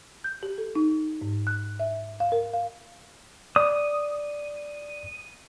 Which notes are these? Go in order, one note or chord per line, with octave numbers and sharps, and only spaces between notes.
G6
G4
A4
D#4
G#2
F#6
E5
F5
A#4
F5
D5 D#6